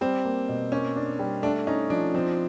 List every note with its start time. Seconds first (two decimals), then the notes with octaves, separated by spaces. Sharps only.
0.01 G3 C4
0.25 A#3
0.49 B2
0.72 A#3 C#4
0.96 D4
1.19 G3
1.43 A3 D4
1.67 C#4 D#4
1.90 F3 D4
2.14 F3 C4